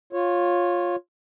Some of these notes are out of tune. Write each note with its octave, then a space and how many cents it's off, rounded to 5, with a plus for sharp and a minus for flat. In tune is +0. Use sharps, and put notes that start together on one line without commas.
F4 +10 C#5 -10